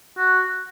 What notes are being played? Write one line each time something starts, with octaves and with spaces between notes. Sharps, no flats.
F#4